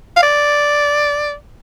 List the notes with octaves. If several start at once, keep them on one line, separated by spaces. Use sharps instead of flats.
F5
D5